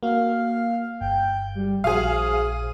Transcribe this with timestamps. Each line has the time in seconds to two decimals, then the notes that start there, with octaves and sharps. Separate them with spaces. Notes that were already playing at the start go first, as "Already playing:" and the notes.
0.03 A#3 F#4 F5
1.00 G1 G5
1.55 G3
1.84 A#1 F#4 G#4 C5 F5 D#6